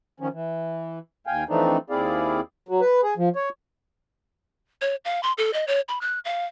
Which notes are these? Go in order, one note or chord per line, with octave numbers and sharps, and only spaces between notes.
D#3 F3 C#4
E3
D#2 F5 G5 G#5
E3 F3 A3 C4 D4 D#4
D#2 C4 E4 G#4 D5 F5
F#3
B4
G#4
F3
C#5
C#5
F5
C6
A4
D#5
C#5
B5
F#6
F5